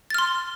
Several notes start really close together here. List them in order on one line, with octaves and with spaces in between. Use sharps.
A6 F6 C6